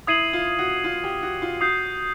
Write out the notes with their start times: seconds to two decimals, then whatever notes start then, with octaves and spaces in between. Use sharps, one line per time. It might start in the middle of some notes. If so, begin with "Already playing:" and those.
0.07 E4 D#6 G#6 C7 D#7 F#7
0.33 F4
0.59 F#4
0.84 F4
1.04 G4
1.23 F#4
1.42 F4
1.61 F#4 D#6 G6 C7